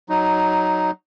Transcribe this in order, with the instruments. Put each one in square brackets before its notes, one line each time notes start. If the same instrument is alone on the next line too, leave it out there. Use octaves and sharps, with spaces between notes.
[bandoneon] F#3 D#4